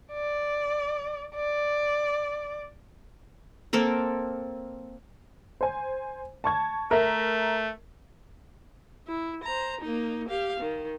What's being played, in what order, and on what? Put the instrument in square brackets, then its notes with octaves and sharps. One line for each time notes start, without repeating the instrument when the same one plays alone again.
[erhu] D5
D5
[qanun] A#3 C4 A4 A#4
[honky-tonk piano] C5 G#5
A5 C#6 G#6
[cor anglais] A3 [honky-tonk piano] A#4 E5
[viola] E4
C5 A#5
A#3 D#4
G4 F5
D#3